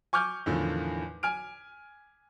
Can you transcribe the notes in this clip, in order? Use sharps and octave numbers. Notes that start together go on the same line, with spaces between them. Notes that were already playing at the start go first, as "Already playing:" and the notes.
G#5 C#6 D6 F6 G6
E2 A2 D3 D#3 F3
G#5 F6 D7